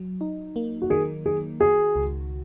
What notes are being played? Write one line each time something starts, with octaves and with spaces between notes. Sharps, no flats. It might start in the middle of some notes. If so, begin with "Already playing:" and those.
Already playing: F#3
D#4
A#3
F#4
D#3 G#4
D#3 G#4
F#4 G#4
C#2